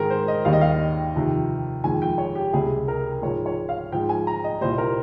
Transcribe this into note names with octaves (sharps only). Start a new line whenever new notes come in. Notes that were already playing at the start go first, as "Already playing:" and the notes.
Already playing: G#2 D#3 G#3 G#4 A#4
C5
D#5
D#2 D#3 G3 F5
D#5
F5
F2 C3 D#3
F2 D#3 G#3 G#5
G5
C#5
G4
C#2 C3 G3 G#4
A#4
G#2 F3 G#3 C#5
C#5
F5
G#2 F3 G#3 G5
G#5
A#5
D#5
C2 A#2 G3 C5
A#4